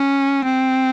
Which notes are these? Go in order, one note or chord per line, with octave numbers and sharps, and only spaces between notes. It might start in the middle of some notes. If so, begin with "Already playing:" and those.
Already playing: C#4
C4